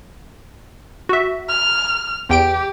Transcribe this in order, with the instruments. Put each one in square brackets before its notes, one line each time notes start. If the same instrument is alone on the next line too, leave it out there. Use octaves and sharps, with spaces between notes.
[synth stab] F#4 E5
[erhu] F6
[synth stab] E2 G5 D7 [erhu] G4